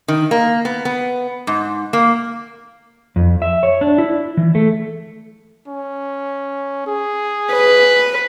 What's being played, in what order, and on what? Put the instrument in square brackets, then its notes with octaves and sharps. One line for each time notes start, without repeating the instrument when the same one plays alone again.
[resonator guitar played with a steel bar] D#3
A#3
B3
B3
G#2
A#3
[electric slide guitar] F2
E5
C#5
D4
E4
E3
A3
[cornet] C#4
G#4
[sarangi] B4